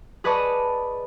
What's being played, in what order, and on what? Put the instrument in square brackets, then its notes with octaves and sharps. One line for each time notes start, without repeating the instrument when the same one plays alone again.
[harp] G#4 B4 D5 D#5 A5 C#6